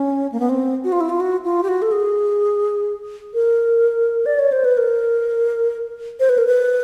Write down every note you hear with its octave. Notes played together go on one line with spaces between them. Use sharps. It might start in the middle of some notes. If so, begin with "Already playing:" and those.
Already playing: C#4
A#3
B3
C4
F#4
F4
E4
F4
F#4
F4
G4
F#4
A4
G#4
A#4
D5
C#5
C5
B4
A#4
C5
B4
A#4
B4